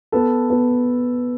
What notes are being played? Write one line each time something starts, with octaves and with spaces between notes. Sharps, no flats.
B3 A4
B3